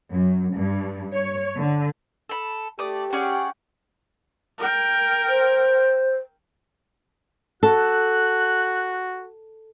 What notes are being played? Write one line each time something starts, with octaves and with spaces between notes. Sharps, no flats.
F#2
G2
C#5
D3
A4 B5
A3 G4 A4 D5 D#6
C#4 G#4 D5 F#5 G5
A#4 G5
C5
F#4 A4 F#6